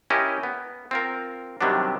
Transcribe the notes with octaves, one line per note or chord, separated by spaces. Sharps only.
C#4 E4 G4 A#4 D#5
B3
C4 F4 A#4
C3 D#3 F#3 G3 B3 D4